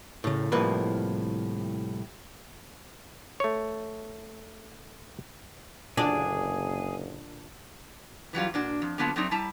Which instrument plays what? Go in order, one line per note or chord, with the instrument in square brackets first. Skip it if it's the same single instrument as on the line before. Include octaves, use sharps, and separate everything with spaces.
[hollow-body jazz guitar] A2 C#3
C2 A2 F3 A#3 B4
[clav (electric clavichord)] A3 C#5
[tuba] F#1 [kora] A#2 D3 [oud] D4 [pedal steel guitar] G#4
[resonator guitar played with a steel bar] E3 F#3 G3 F4
A#2 D4 F#4
F2
D3 F#3 A#3 B3 F4 A5
F#3 A3 C4 D4 D#4
G3 E4 A5 A#5